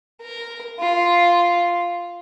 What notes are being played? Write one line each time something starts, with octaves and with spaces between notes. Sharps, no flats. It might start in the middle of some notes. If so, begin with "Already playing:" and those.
A#4
F4